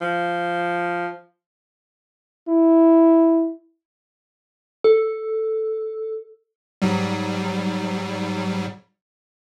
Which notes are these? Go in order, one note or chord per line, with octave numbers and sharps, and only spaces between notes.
F3
E4
A4
G#2 F#3 G3